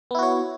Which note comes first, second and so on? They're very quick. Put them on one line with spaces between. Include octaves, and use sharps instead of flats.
B3 E4 F#4 C#5